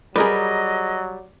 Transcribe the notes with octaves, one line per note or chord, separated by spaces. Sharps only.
F#3 G3 G#4 A#4 B4 D#5